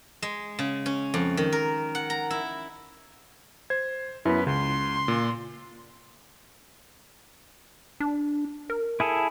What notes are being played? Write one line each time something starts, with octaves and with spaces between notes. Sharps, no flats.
G#3
C#3
C#4
F2
D#3
A#4
F#5
A#5
E4
C5 G#6
F#2 B3 E4 B4
C#2 C#3 C6
A#2
D4
A#4
E4 G#4 A4